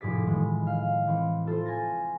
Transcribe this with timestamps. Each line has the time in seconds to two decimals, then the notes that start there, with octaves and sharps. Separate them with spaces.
0.01 F1 A2 G#4 D5 B6
0.27 A2 D#3 E3 G#3
0.67 F5
1.07 E3 C4
1.46 F4 A4 C5
1.66 G#5 C6 A6 A#6